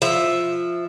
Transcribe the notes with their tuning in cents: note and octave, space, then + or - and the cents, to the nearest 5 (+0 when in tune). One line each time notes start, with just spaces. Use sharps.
F3 +0 E5 +0